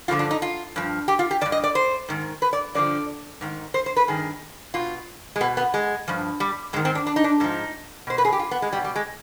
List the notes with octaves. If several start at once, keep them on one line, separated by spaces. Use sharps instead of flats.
G2 D3 F3 F4
D4
D#4
F4
G2 F3
G4
F4
G4
D#3 D5
G2
D#5
D5
C5
G#2 D#3
B4
D5
G2 D3 F3 D5
G#2 D#3
C5
C5
B4
G2 D#3 G#4
B2 F4
G#3
B2 B3
B3
G#3
G2 F3
G3
G#2 D#3 G#3
C4
D4
D4
D#4
D4
G#2 F3 D#4
B2 C5
B4
G#4
G4
F4
B3
G#3
B2 G3
G3
G#3